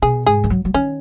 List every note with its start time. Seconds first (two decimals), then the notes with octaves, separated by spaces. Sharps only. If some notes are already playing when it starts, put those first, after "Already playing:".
0.02 B2 G#4
0.26 G#2 G#4
0.44 D#3
0.50 F#3
0.65 F#3
0.74 D#3 C#4